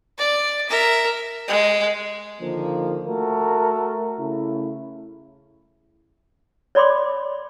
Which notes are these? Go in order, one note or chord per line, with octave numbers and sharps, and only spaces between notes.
D5
A#4 E5
G#3
D3 D#3 F3 A#3
A3 F#4 A4 A#4
C#3 A3 E4
C#5 D5 B5 C6 D6